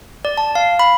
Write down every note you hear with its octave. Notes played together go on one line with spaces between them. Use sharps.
D5
A5
F5
B5